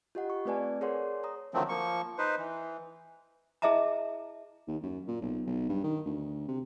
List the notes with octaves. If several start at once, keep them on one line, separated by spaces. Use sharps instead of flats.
F4 G4 D#5 F#5
C#6
A3 C4 B4 D5 G#5 A5
G#4 A#4 C#5 D5 F#5 C6
C#5 A#5 D#6
D3 D#3 F3 F#3 A3 C4
F3 A#3 C#6
D#4 B4 C5
E3
E4 G#4 D#5 E5 A5 A#5
D#2
F#2
A#2
B1
B1
G2
D#3
D2
C3